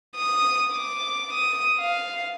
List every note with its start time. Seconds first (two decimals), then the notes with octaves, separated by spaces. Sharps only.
0.16 D#6
0.74 D6
1.33 D#6
1.79 F5